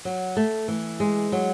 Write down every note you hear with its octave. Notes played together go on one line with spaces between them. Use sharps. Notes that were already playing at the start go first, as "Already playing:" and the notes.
F#3
A3
E3
G#3
F#3